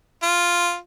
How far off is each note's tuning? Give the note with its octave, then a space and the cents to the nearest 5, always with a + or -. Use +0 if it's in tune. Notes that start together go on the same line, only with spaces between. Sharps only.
F4 +0